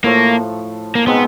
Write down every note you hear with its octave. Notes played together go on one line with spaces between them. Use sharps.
A2 F3 A3 A#3
A#3
B2 G#3 B3 C4 D#4